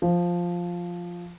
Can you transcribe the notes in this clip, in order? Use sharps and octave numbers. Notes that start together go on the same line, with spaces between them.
F3